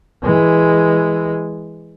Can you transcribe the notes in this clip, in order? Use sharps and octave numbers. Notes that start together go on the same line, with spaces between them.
E3 G#3